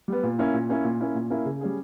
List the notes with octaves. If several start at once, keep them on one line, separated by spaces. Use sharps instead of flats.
G3 B3
A#2
A#3 C#4 E4
A#2
A#3 C#4 E4
A#2
A#3 C#4 E4
A#2
A#3 C#4 E4
C#3
G3 C#4 G#4